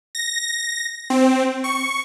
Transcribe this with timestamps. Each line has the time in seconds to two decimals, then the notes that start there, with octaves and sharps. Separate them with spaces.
0.15 A#6
1.10 C4
1.64 C#6